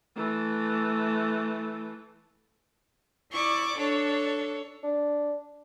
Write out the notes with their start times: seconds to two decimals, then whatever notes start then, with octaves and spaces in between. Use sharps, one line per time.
0.15 E3 A3
3.32 E4 D5 C#6 D6
3.78 D4 A4 C#5
4.83 D4